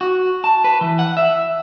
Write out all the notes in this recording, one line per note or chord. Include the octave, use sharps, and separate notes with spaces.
F#4
A5
B4
E3
F#5
E5